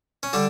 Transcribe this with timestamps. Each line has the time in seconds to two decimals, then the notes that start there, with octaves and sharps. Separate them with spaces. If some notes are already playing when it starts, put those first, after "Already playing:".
0.23 C#4
0.33 D3 G3 D4